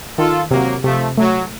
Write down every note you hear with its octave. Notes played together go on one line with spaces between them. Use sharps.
D#3 F4 A4
C3 F#3 A#3
C3 F3 A3
F#3 A3